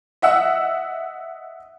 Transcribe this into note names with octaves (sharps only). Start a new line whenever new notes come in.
D#5 E5 F#5 E6